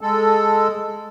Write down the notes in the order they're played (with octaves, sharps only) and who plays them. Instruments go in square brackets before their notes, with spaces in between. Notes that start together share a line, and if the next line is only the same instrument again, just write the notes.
[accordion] G#3 A4